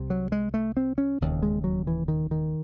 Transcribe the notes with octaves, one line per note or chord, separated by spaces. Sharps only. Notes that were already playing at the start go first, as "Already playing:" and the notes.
Already playing: C2 C3
F#3
G#3
A3
C4
C#4
E1 D#2 C#3
G#3
F#3
E3
D#3
D#3